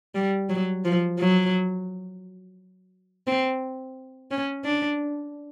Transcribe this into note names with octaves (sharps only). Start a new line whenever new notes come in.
G3
F#3
F3
F#3
C4
C#4
D4